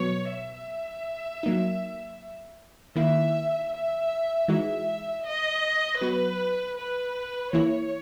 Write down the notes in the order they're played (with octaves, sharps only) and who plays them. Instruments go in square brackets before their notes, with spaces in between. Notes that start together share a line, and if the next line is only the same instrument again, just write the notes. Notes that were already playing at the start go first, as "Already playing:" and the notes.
Already playing: [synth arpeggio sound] B2 F#3 B3 [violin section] C#5
[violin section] E5
[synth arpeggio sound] F#3 A#3 D#4
[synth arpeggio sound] D#3 A#3 E4 [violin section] E5
[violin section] E5
[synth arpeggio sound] E3 G#3 D#4 F#4 [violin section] E5
[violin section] D#5
[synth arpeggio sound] F#3 B3 F#4 [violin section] B4
[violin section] B4
[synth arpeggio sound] E3 A#3 E4 [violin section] C#5